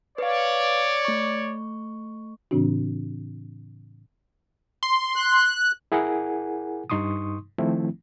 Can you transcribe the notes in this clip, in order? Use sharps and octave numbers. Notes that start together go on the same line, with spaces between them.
B4 C#5 D5 F5
A3 C#6
A2 C#3 E3 C4 D4 F#4
C6
F#6
E4 G#4 A#4 F#5 G#5
G2 D#4 C6 C#6 D#6
D#3 F3 A3 C4 E4